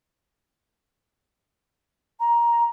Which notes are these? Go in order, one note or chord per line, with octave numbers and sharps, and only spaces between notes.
A#5